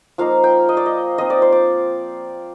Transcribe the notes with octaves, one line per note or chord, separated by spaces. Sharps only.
F3 A#3 D#4 F5
G5
D#5
D5
D#5
F3 C4 D#4 D#5
D5
C5
D5